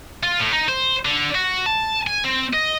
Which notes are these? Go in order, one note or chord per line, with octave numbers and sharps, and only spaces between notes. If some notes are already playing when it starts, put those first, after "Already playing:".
F4
A2
D#4
C5
D3
F#4
A5
G#5
C4
D#5